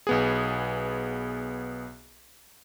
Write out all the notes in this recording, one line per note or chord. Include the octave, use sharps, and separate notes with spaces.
B1 B3 G#4